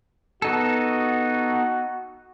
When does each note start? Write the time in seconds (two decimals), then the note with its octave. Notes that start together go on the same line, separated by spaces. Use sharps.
0.42 B3 D#4 F#4 A4